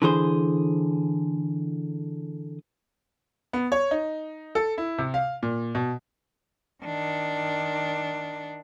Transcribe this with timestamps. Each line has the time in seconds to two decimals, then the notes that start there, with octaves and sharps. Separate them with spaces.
0.02 D3 E3 G#4 C5
3.53 B3
3.72 C#5
3.91 D#4
4.55 A4
4.78 E4
4.98 C3
5.14 F5
5.43 A#2
5.75 B2
6.84 D#3 D4